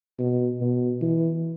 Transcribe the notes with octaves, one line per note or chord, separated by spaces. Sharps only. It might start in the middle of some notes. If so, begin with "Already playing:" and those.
B2
B2
E3